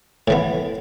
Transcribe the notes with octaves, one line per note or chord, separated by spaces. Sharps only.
A2 E3 B3